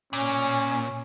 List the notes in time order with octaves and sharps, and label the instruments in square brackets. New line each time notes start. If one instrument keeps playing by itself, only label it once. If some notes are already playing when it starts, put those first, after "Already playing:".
[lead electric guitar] A#2 [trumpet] C#4